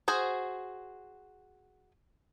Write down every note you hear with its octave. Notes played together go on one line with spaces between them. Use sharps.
F#4 G#4 C5